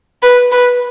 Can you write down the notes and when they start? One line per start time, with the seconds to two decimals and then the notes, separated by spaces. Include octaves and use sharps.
0.23 B4
0.52 B4